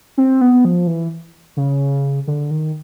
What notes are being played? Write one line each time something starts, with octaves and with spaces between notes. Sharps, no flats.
C4
B3
F3
E3
C#3
D3
D#3